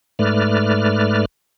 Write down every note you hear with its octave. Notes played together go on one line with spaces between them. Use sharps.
G#2 A3 B4 D5 F6